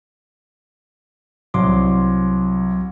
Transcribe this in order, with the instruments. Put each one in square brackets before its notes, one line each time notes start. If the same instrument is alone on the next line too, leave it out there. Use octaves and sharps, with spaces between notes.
[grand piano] C2 [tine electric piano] F#3 C6 D6